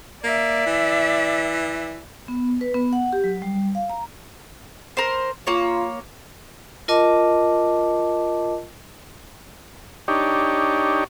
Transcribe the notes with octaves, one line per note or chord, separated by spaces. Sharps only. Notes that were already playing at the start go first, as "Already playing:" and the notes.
A#3 D5 E5
E3
B3
B4
B3
F#5
G4
F#3
G3
F5
A#5
A#4 C5
A#3 F4 C#5
F4 A#4 D#5 A5 D6
D4 D#4 G4 C#5